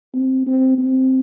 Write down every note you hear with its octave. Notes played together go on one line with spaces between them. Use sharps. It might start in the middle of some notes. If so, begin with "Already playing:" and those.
C4
C4
C4